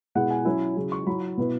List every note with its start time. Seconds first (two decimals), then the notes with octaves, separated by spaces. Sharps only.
0.15 B2 G#3 E4 F#5
0.31 G#5
0.45 F#3 C#4 E4
0.76 C#3 F#3 E4
0.92 C#6
1.07 F#3 E4 B5
1.38 B2 B3 E4